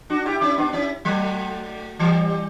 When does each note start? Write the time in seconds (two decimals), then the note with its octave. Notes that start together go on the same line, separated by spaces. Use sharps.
0.10 D4 F#4
0.26 E4 G4
0.41 C#4 E4
0.58 B3 D4
0.73 C#4 E4
1.05 F#3 A3
1.99 E3 G3